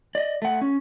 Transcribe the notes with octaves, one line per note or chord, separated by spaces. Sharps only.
D5 D#5
A3 F#5
C#4